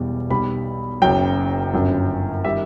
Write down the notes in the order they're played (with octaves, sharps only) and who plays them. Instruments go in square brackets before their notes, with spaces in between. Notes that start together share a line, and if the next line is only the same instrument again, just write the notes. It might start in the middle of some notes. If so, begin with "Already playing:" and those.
Already playing: [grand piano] E1 E2 B2 G3
B1 B2 G3 B5
F#1 F#2 F#3 G5
G1 F#2 F#3
D#3 G3 E5